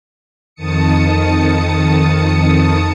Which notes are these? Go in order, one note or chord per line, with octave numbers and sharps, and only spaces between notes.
F2 D#3 A5 D#6 C#7